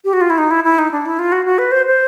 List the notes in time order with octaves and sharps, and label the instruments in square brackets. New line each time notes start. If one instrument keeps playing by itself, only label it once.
[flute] G4
F#4
F4
E4
D#4
E4
E4
D#4
D4
E4
F4
F#4
F#4
B4
C5
C5